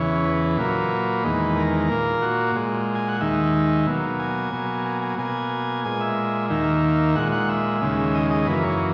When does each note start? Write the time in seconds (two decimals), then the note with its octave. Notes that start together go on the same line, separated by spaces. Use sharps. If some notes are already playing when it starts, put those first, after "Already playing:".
Already playing: E2 C#3 E3 C#5
0.25 B4
0.58 A#2 F#3 A#3
1.24 E2 D#3 G#3
1.56 A#4
1.89 A#2 A#3
2.22 F#4
2.55 A#2 G#3
2.95 G#5
3.08 F#5
3.21 D#2 D#3 G#3 E5
3.87 B2 F#3 A#3
4.19 G#5
4.53 B2 F#3 A#3
4.86 G#5
5.02 G#5
5.18 B2 A#3 G#5
5.84 A#2 G#3 G#5
6.01 E5
6.50 D#2 D#3 A#3 E5
7.16 A#2 G#3 F#5
7.32 F#5
7.49 E5
7.81 D#2 C#3 G#3
8.15 D#5
8.31 D#5
8.47 F#2 E3 A#3 B4
8.64 C#5